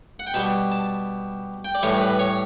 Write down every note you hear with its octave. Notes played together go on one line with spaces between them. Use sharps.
F#5
G5
B2 G3 A5
A5
G5
D5
A2 E3 G3 C#5
B4
C#5